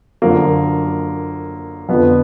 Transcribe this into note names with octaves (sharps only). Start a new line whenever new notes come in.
F#2 D3 F3 A#3
F2 D3 F3 B3